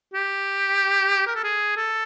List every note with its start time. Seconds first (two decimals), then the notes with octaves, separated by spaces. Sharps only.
0.14 G4
1.26 A#4
1.35 A4
1.44 G#4
1.77 A4